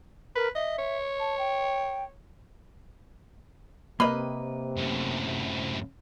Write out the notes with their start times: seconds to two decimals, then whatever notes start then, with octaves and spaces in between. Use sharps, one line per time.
0.35 A#4 B4
0.55 D#5 E5
0.78 C#5
1.20 A5
1.38 G5
4.00 C3 A#3 B4 D#5 B5
4.77 F#2 A2